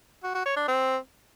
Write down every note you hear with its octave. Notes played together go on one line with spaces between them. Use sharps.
F#4
F#4
C#5
D4
C4